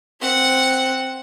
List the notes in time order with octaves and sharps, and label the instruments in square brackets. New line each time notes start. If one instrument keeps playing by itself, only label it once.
[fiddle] C4 F#5